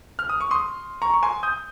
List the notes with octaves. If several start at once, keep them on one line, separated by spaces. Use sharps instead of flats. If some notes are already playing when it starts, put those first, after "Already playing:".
F6
D#6
C#6
C6 D#6
A#5 C#6
C#6
G#5 C6
D#6 G6